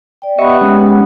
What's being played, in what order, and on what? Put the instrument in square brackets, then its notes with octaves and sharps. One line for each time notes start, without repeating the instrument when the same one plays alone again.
[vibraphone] D5 G5
[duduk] B3 [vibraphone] G4 G5 B5 [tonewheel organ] D#5 E5 C#6
[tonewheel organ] G#3 C#4